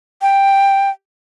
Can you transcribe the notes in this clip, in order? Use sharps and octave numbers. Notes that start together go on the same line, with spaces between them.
G5